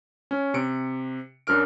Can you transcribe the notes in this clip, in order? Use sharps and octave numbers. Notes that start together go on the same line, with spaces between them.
C#4
C3 C#7 D7
F#2 D4 A#4 F6 D7